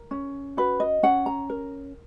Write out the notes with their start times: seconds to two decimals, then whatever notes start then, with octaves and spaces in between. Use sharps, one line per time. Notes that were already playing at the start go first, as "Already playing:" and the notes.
Already playing: A#4
0.11 C#4
0.57 F#4 B4
0.80 D#5
1.03 C#4 F#5
1.26 A#5
1.49 A#4